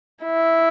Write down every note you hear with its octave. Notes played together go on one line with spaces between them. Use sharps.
E4